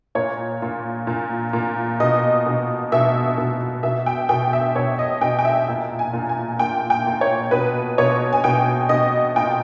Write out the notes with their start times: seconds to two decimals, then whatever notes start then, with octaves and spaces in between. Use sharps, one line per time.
0.15 A#2 C#5
0.62 A#2
1.07 A#2
1.53 A#2
2.00 B2 D#5
2.46 B2
2.92 B2 E5
3.38 B2
3.83 B2 E5
4.06 G5
4.29 B2 G5
4.53 E5
4.75 B2 C#5
4.99 D#5
5.21 B2 G5
5.39 G5
5.45 E5
5.68 A#2
5.99 G#5
6.13 A#2
6.29 G#5
6.59 A#2 G5
6.90 G5
7.06 A#2
7.21 C#5
7.51 B2 B4
7.98 B2 C#5
8.33 G#5
8.44 B2 G5
8.89 B2 D#5
9.36 A#2 G5